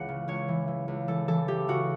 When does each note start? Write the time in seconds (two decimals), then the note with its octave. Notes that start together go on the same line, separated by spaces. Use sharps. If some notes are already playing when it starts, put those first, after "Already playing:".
Already playing: C#2 E3 F#5
0.09 C#3
0.28 C#2 C#5
0.48 E3
0.68 E3
0.88 C#2
1.08 E3 A4
1.28 E3 A4
1.48 E3 G4
1.68 C#3 F#4